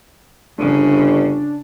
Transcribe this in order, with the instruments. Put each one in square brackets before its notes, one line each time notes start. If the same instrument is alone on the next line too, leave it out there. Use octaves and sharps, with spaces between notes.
[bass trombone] G1 [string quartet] C#3 [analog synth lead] D4